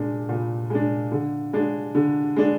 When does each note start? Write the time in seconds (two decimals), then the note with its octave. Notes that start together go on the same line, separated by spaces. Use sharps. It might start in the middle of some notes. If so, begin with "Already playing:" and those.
Already playing: A#2 G#3 D4
0.29 A#2
0.70 G#3 D4
1.12 D3
1.53 G#3 D4
1.95 D3
2.36 G#3 D4